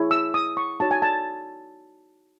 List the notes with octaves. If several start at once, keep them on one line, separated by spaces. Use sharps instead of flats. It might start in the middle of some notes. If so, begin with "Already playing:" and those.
Already playing: E4 G#4 C#5
E6
D#6
C#6
D#4 F#4 C#5 A5
G#5
A5